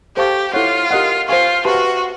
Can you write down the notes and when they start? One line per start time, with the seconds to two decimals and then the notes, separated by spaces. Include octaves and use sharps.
0.17 G4 A4 C5 F5 A5 C#6
0.54 E4 F4 A4 C#5 F#5
0.91 G4 A#4 D#5 F#5
1.28 F4 C5 F5 G#5 C#6
1.65 F#4 G4 B4 E5 A5 C6